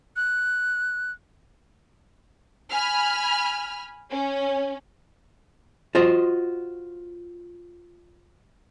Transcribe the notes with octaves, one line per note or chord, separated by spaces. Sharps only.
F#6
G#5 B5 F6
C#4
F4 F#4 C5 D#5